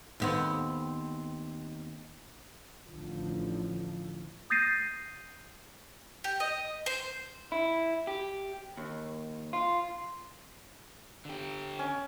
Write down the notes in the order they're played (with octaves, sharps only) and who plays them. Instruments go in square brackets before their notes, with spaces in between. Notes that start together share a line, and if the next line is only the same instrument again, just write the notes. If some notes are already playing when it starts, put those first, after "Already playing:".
[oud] D#2 B3 C4
[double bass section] A1 D3 F3
[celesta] D#6 G6 A6 A#6 C7 D#7
[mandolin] G4
D#5
C5
[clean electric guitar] E4
G4
D#2
F4
[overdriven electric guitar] D3 G4
[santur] C#4